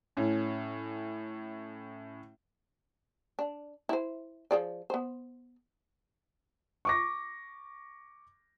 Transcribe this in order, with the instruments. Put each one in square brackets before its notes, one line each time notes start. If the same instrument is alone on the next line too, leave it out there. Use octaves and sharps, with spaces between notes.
[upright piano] A2 C#4
[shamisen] D4
E4 C5
F3 G#4 D5
B3 C5
[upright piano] C#6 D6 A#6